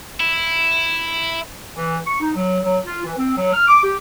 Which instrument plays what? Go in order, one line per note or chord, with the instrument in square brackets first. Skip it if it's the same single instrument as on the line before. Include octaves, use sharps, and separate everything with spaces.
[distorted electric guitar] E4
[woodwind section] E3
C#6
D#4
F#3
F#3
F4
E3
C4
F#3
F6
D6
G4